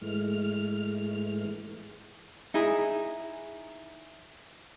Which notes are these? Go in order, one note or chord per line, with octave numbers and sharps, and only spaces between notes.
G#2 E3 G#3 A3 F6
D#4 E4 G#4